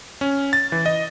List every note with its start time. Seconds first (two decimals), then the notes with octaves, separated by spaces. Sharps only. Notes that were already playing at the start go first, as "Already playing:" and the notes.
0.21 C#4
0.53 A6
0.72 E3
0.86 D#5